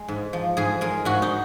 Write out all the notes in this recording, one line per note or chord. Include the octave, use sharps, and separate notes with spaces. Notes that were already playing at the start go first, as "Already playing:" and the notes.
Already playing: G#3
G#2
F3
G#2 G#4
G#3 A#4
G#2 F#4
D#4